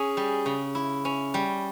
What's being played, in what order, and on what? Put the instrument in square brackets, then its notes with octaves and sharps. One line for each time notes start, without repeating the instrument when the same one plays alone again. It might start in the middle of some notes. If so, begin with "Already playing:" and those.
Already playing: [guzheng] C#4 [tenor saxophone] G#4
[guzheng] G3
C#3
E4
C#4
G3